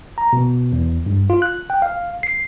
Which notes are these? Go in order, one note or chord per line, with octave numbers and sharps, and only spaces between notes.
A#5
B2
E2
G2
F4
F#6
G5
F5
C7